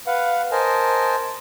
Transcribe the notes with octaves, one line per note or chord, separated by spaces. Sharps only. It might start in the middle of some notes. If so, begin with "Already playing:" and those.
B4 F5 F#5
A#4 C5 D#5 G#5 A5